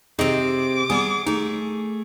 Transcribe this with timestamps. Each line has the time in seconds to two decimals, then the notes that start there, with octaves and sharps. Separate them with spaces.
0.19 C3 C4 D#4 G#4 D#5 D6
0.90 G3 B3 G#4 D#6
1.26 A3 D#4 G#4